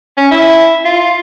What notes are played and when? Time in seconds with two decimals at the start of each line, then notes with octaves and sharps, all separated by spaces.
0.17 C#4
0.31 E4
0.85 F4